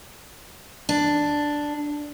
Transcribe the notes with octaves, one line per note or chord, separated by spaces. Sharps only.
D4